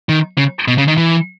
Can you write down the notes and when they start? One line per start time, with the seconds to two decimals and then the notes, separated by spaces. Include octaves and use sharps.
0.09 D#3
0.38 C#3
0.68 B2
0.78 C#3
0.88 D#3
0.97 E3